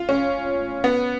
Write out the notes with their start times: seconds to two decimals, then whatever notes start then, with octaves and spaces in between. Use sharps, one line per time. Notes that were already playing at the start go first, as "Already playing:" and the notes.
Already playing: F4
0.09 C#4
0.84 B3